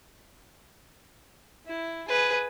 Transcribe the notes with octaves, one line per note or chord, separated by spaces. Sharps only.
E4
G#4 B4